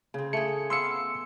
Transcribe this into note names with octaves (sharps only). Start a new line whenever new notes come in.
C#3 C4
A3 G#4 C#7
B3 F5 C6 E6 C#7